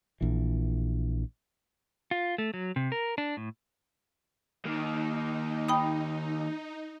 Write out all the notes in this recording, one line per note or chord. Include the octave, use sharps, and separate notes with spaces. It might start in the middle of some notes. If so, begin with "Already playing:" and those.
A#1 E3
F4
A3
F#3
C3
A#4
D4
A2
D#2 A#3 D#4
G5 B5 D#6